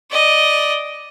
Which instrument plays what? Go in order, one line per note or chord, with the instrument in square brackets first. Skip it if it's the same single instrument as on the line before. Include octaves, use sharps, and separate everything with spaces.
[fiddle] D5 D#5